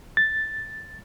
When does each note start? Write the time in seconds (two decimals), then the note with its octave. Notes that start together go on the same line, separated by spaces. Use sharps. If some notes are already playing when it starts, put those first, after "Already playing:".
0.17 A6